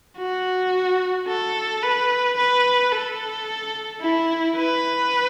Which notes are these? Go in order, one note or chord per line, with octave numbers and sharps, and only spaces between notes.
F#4
A4
B4
B4
A4
E4
B4